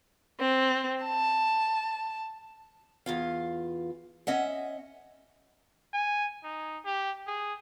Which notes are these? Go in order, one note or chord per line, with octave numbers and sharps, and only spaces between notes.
C4
A5
E2 F4 F5
C#4 D#5 E5 F#5
G#5
D#4
G4
G#4